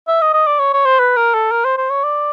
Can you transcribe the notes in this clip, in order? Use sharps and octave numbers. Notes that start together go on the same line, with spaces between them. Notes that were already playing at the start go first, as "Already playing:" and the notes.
E5
D#5
D#5
D5
C#5
C#5
C5
B4
A#4
A4
A#4
C5
C5
C#5
D5